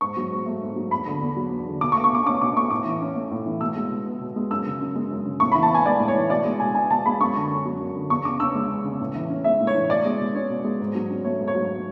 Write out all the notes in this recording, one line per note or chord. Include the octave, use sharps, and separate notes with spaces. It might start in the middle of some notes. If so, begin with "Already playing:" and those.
G#2 C#6
F#3
G#2
A3
G#2
F#3
E2 B5
D3
E2
F#3
E2
D3
B2 D6
C#6
A3
C#6
B2 D6
C#4 D6
B2 D6
A3 C#6
A2 D6
E3
C#4
A3
A2
E3
B2 E6
G#3
B2
B3
B2
G#3
F#2 E6
C#3
F#2
G#3
F#2
C#3
A2 C#6
B5
E3
A5
B3 G#5
G#3 D5
A2
C#5
E3
B2 D5
G#3
B2 G#5
B3 G#5
B2 A5
G#3 B5
F#2 C#6
D3
C#4
F#3
F#2
D3
E2 C#6
C#3 D6
C#4 E6
G#3
E2
C#3
A2
E3
C#4
G#3 E5
A2
C#5
E3
B2 D5
G#3
B2
C#4 C#5
B2
G#3
G#2
F#3
C#4
A3 C#5
G#2
C#5
F#3